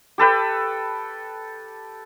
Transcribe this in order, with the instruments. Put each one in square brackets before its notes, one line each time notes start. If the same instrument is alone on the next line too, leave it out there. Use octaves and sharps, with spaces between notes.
[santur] G4 A4 B4 G5